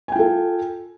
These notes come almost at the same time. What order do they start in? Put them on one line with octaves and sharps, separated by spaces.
G#5 G5 F4 A4